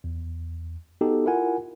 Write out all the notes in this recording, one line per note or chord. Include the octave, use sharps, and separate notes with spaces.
E2
B3 D#4 F#4 G4 A4
E4 F4 A#4 F#5 G#5